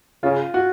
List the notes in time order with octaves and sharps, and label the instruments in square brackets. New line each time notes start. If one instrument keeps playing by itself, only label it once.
[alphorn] C#3 [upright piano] F4
[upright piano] F#4